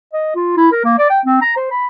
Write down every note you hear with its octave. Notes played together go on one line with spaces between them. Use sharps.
D#5
F4
E4
A#4
A#3
D5
G5
C4
A#5
C5
B5